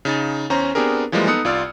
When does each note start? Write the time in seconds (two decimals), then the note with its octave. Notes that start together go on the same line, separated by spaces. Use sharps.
0.05 C#3 D#4 A6
0.50 E2 C#4 C5 A#5
0.75 B3 C4 D4 G4 G#4 A#4
1.12 E3 F3 G3 G#3 A#3
1.27 B3 D#4 A4 D#6 F#6 C#7
1.45 C2 F4 D5 E6 F6